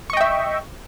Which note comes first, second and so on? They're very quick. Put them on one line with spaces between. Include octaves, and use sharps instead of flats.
C#6 D#5 G5 E5